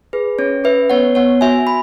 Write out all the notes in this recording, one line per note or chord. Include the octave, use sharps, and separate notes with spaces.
G#4 B4
C#4 C#5
C#4 B4 E5
B3 C#5 F#5
B3 C#5 F#5
F#4 E5 G#5
B5